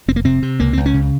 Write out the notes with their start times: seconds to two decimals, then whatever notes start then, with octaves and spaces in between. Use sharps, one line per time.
0.08 F1 C4
0.16 A#3
0.25 C3 C4
0.42 C3
0.60 C#2 A#3
0.73 C#2 C4
0.86 C#4
0.94 C#3